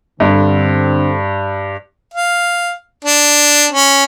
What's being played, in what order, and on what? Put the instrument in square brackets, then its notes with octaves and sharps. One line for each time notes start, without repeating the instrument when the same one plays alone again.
[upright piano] G2 [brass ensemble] D3 C4
[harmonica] F5
D4
C#4